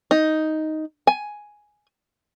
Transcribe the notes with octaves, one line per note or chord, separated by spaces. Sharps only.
D#4
G#5